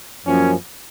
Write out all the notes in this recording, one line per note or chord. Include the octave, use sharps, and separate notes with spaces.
F#2 F3 A#3 C#4